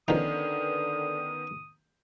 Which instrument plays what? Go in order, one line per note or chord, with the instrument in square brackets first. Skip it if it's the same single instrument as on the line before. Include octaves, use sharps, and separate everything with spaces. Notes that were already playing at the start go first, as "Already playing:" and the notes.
[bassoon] D3 [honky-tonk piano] D#3 B3 C#4 [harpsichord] F3 D#4 [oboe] D#6